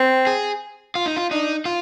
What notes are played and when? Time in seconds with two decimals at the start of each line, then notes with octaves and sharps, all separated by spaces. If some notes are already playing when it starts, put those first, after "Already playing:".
Already playing: C4
0.27 G#4
0.95 F4
1.06 D#4
1.16 F4
1.31 D4 D#4
1.65 F4